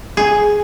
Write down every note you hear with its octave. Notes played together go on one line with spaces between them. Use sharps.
G#4